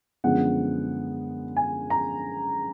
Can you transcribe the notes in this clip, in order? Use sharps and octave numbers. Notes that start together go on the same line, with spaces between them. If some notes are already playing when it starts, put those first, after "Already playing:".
F#2 D3 F3 G#3 B3 F#5
G#5
A#5